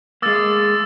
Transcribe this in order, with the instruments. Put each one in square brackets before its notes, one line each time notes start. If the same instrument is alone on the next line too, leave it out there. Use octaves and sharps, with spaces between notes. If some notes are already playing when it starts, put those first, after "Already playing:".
[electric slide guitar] G#3 A#3 [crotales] D6 E6 A6